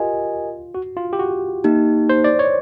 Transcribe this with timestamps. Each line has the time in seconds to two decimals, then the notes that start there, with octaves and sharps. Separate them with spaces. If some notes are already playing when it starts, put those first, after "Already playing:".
Already playing: F4 G4 A#4 D#5 G#5
0.75 F#4
0.97 F4
1.13 G4
1.19 F#4
1.64 A#3 D#4 G4
2.09 C5
2.24 D5
2.39 C#5